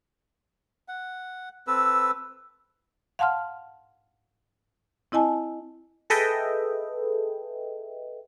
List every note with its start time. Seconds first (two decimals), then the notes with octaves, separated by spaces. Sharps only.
0.88 F#5
1.67 C4 A4 B4 E6
3.19 F5 F#5 A5 C6 F6
5.12 C4 E4 D#5 G#5 A5
6.10 G#4 A4 B4 D#5 E5 G5